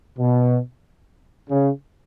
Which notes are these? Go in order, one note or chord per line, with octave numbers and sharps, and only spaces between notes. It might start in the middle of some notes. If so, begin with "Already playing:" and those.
B2
C#3